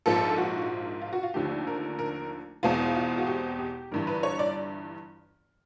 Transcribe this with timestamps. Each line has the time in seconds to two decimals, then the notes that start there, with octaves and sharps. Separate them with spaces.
0.06 A#1 G#2 F3 A#3 A4
0.38 F#4
1.02 F4
1.13 F#4
1.23 F4
1.34 D#2 D3 F3 A3 G4
1.67 A#4
1.99 A#4
2.63 E2 B2 G#3 C4 E4 F4
2.95 F4
3.18 F#4
3.27 G4
3.59 G4
3.91 G1 G2 E3 A#4
4.07 B4
4.23 C#5
4.39 D5